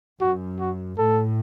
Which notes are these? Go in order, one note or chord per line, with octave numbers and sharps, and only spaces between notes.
F#2 F#4
F#4
A2 A4